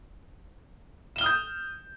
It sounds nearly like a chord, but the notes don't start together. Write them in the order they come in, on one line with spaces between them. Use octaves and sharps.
E7 G7 F6 D#6 G6